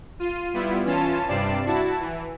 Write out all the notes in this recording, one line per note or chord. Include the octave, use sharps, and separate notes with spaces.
F4 D#7
G3 B3 E4 F4
E3 C#4 F4 A5
G2 C3 G3 D5 C7 E7
E4 F#4 A5
E3